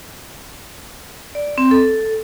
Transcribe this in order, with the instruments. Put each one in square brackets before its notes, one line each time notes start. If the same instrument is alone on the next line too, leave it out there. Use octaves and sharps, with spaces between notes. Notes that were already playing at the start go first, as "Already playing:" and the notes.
[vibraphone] D5
C4
A4